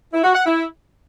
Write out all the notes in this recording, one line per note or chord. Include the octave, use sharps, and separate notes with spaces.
E4
F#4
F#5
E4